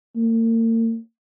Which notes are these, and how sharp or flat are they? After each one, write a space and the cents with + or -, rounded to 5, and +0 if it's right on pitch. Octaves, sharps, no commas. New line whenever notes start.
A#3 -40